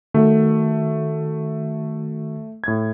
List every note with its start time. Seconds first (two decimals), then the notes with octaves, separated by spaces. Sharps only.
0.14 D#3 A3 F#4
2.64 A2 G#6